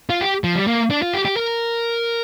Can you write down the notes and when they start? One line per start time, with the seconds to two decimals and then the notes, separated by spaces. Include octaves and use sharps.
0.10 F4
0.21 G4
0.44 F3
0.56 G3
0.67 A#3
0.90 D4
1.02 F4
1.13 G4
1.25 G4
1.37 A#4